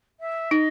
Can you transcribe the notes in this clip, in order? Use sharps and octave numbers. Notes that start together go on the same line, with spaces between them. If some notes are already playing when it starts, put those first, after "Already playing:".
E5
D#4 D#5